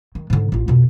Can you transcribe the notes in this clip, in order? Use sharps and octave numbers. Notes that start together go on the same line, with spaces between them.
D#3
G#2 D3
A1 F4
F2 B2